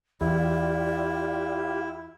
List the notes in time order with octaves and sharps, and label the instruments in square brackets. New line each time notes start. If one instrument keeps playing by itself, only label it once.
[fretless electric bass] E2 [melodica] E4 [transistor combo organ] F4 G4 [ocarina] D5